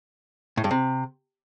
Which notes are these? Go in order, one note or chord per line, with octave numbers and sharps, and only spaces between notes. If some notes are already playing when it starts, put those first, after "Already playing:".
A2
G2
C3